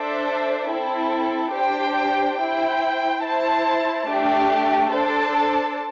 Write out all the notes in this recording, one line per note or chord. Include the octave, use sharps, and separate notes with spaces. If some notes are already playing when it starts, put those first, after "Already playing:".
Already playing: D4 A4 C5 E5
C4 E4 A4
D4 G4 C5 G5
E4 C5 G5
E4 C5 A5
A3 D4 G4
D4 A4 C5 A5